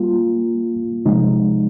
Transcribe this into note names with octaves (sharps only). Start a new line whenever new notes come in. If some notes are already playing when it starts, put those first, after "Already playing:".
Already playing: G3 A#3 F4
C3 F3 G#3 D#4